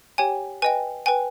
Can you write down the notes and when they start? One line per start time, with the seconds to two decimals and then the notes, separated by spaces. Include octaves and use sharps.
0.18 G4 C#5 G5 G#5
0.62 B4 D#5 G5 G#5
1.06 B4 G5 G#5